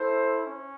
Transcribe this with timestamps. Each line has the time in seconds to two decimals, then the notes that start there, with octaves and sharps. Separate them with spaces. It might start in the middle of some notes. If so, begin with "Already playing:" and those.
Already playing: E4 A4 C5
0.47 C#4